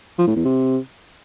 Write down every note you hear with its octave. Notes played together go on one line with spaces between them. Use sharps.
F3
A2
E2
C3